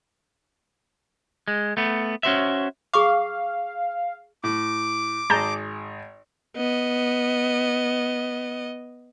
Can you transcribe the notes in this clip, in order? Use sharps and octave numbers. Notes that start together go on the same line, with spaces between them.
G#3
A3 B3
C#4 F#4 C5 E5
G#4 F5 C#6 D6
A2 D6
G#1 G#4 A5 A#5 G6
B3 D#5